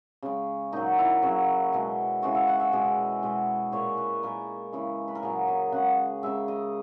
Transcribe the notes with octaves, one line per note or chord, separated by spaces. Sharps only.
C#3 G#3
A#2 F#3 D#4
E4
C#3 F#3
B2 G#3
C#3 E3 G#3 F#4
E5
F#5
E5
B2 G#3 G#4
B2 G#3
A#2 G#3 C#5
B4
A#2 G#3 A#4
C#3 E3 G#3
B4
A#4
A#2 F#3 G#4
G#4
C#3 G#3 F#5
C#3 G#3 E5
D#5